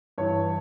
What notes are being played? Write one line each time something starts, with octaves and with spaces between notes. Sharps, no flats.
G2 E3 C#5